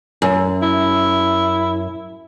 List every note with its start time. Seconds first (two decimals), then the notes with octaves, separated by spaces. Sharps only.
0.22 F#2
0.62 E4